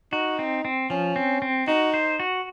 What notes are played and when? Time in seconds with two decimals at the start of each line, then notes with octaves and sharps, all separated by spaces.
0.12 D#4 F#4
0.39 C4
0.65 C4
0.90 F3 C#4
1.16 C4
1.42 C4
1.67 D#4 F#4
1.94 C5
2.20 F#4